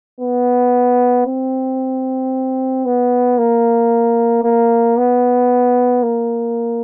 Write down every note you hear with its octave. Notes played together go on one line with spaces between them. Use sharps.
B3
C4
B3
A#3
A#3
B3
A#3